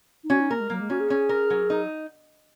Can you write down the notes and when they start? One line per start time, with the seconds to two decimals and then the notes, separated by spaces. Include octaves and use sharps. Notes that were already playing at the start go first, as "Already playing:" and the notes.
0.24 D#4
0.30 C#4 F#4
0.40 D#4
0.50 A#3 A#4
0.60 G#3
0.70 F#3 A#3
0.80 G#3
0.90 C#4 F#4
1.00 G#4
1.10 C#4
1.29 A#4
1.50 F#3
1.70 D#4